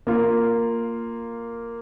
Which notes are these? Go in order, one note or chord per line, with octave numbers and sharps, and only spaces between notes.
A#3 F4